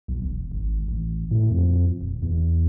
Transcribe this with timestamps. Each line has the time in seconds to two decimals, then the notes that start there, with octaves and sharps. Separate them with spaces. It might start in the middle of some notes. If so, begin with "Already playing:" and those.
0.08 B1
0.22 E1
0.51 G#1
0.88 A1
1.31 A2
1.51 F2
2.01 D#1
2.22 E2